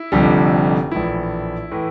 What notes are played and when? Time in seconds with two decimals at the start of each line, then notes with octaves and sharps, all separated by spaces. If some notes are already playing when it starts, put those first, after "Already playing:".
Already playing: E4
0.12 F1 F2 D3 G3
0.91 A#1 A2 E3 E4
1.71 A2 E3